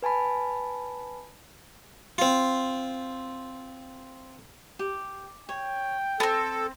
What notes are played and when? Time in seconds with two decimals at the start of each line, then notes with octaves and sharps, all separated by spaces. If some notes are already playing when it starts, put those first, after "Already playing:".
0.02 B4 G#5 A5 B5
2.18 C4 F4
4.79 G4
5.49 C#5 G5
6.20 B3 C4 A4 A5